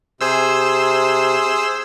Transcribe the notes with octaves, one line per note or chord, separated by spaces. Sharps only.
C3 G#4 C5 E6